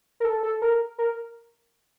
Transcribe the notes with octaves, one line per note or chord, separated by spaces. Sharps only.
A#4
A4
A4
A#4
A#4